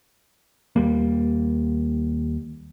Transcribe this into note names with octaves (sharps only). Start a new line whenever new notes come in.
D#2 G3 A#3